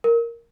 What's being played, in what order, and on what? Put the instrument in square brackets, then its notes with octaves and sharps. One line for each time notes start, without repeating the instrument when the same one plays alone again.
[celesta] A#4